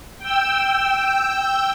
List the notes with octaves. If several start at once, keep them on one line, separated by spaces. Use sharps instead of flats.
G5 E6